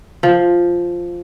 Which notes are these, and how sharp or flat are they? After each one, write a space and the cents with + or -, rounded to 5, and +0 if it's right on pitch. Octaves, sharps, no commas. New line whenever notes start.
F3 +0